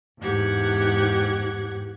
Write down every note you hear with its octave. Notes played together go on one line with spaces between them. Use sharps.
E2 G#2 G4 F#5 G#6